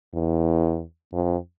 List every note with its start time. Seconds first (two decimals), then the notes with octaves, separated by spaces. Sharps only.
0.14 E2
1.13 F2